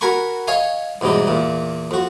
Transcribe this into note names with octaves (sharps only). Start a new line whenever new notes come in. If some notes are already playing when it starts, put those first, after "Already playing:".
F#4 A#4 G#5 B5 C#6
C#5 D#5 F5 G#5
E2 G#2 B2 G3 D#4
E2 A#2
F2 F#4